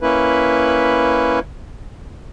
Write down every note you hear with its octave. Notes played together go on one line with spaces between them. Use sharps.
A#3 C#4 E4 B4